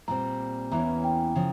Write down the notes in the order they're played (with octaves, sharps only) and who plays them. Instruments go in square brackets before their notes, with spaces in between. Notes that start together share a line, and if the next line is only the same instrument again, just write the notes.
[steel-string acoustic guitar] A#2 G3 C4 [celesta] A#5
[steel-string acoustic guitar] E2 E3 A#3 C#4 [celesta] A#5
[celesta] G5
[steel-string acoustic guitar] C#3 F3